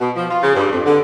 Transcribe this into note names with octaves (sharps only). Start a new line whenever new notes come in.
B2
F3
F4
C#3
G2
F2
D3